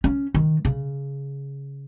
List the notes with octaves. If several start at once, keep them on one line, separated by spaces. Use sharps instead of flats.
C#4
D#3
C#3